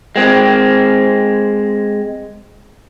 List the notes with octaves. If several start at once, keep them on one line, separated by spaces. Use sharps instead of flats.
G#3 C4